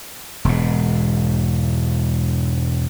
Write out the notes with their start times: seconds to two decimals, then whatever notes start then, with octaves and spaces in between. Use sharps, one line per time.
0.45 E1 G#2